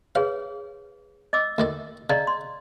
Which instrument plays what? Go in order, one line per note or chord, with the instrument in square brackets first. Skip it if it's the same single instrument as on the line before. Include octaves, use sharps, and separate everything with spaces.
[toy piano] G#4 B4 C#5 [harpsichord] F5
[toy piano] D#5 D6 E6
[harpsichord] D2 D#3 D5
[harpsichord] C#3 [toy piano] D5 D#5 A#5
[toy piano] C6